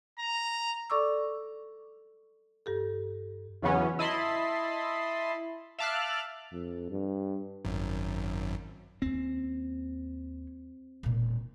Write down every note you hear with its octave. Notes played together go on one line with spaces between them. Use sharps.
A#5
A4 D5 C#6 D6 E6
G2 G4 A4
E2 C#3 E3 F#3 B3 C#4
E4 D#5 A5 B5 C6
E5 F5 A5 D6 F6 F#6
F2
G2
G#1 F#2
D#2 C4 C#4
E1 A#2